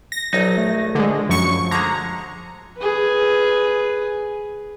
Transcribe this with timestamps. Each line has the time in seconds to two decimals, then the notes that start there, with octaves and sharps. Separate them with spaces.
0.12 A#6
0.33 A#1 F#3 D#4
0.58 A3
0.95 D3 G#3
1.29 F#2 F3 C#6 C#7
1.71 D3 G#3 A#5
2.78 G#4 B4